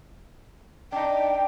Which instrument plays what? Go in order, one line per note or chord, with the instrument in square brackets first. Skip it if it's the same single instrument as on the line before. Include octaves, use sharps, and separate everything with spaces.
[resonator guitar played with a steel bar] D4 D#4 [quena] G5